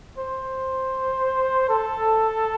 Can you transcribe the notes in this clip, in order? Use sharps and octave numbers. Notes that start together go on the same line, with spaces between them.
C5
A4